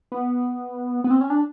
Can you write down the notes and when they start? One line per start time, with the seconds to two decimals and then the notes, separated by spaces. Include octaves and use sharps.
0.12 B3
1.04 B3
1.11 C4
1.21 C#4
1.30 D4